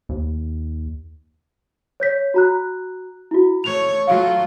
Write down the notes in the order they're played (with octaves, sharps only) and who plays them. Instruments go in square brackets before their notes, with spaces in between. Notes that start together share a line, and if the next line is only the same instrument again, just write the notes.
[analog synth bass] D#2
[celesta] C#5 G6 B6
F#4 A#5 F#6
E4 F#4
[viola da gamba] A3 C#5 [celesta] F7
[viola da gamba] F#3 A3 F4 [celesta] F5